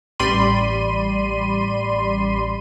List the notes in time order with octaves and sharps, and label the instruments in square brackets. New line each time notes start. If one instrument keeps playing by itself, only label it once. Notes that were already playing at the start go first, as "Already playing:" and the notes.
[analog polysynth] A1 G3 D5 B5 C6 D#7